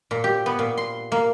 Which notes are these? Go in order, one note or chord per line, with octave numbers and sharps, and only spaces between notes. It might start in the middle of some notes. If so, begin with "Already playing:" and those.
A#2
G4
B3
A#2
C6
A#3